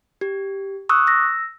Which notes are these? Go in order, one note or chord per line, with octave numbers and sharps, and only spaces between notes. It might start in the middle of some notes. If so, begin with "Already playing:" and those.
G4
C#6 D#6 E6 F#6
E6 A#6